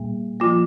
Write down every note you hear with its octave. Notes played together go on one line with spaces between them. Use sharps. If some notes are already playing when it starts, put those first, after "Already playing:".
Already playing: A#2 G3 A#3
F3 A#3 F4